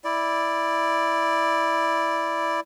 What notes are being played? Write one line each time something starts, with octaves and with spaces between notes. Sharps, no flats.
E4 D5